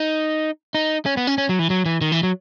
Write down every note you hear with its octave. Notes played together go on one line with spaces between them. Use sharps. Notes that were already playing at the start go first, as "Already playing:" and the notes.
Already playing: D#4
D#4
C#4
B3
C#4
C#4
F#3
E3
F#3
E3
D#3
E3
F#3